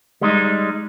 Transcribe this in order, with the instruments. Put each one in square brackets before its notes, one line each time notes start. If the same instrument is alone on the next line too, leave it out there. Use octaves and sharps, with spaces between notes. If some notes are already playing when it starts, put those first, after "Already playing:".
[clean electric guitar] G3 G#3 D#4